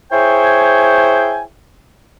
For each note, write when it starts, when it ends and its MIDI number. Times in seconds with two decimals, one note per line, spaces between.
0.12 1.42 64
0.12 1.42 68
0.12 1.42 72
0.12 1.42 73
0.12 1.42 79
0.12 1.42 80